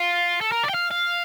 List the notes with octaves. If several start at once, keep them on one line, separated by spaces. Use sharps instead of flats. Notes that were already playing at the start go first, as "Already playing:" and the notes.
Already playing: F4
A4
A#4
D5
G5
F5
F5